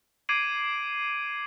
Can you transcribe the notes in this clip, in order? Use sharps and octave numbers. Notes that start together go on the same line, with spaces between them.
D6 G#6 C7 D7 D#7 F#7